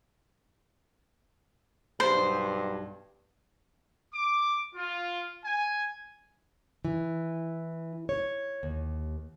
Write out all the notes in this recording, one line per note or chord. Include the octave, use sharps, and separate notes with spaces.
B1 G2 C5
D6
F4
G#5
E3
C#5
D#2